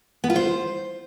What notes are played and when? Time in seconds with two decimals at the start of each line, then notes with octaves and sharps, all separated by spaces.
0.24 B3
0.30 F4
0.36 C5